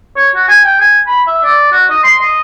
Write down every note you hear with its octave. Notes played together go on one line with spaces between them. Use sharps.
C#5
F#4
G#5
G5
G#5
B5
E5
D5
F#4
D#5
C6
D#5